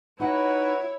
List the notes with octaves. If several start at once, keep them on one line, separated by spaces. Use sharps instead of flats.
D#4 E4 F#4 B4 C#5 D#5 F#5